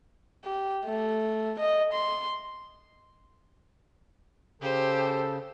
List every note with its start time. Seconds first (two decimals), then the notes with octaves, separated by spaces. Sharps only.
0.44 G4
0.85 A3
1.59 D#5
1.93 C6
4.62 C#3 G4 A4 C5